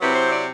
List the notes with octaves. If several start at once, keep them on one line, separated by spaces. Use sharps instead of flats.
C3 F#3 C4 E4 B4
C5
D5